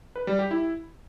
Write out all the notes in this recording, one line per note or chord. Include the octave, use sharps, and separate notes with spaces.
B4
G3
G4
E4